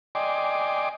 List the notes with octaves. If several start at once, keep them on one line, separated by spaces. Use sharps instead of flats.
D5 D#5 G5 G#5 C6 D6